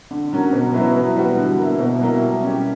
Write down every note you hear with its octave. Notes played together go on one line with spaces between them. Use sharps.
D3
F#3 C#4 F#4 A#4
B2
F#3 B3 E4 B4
E3
G3 B3 F#4
D3
A#3 E4
B2
F#3 A#3 E4
G3
C#4 G4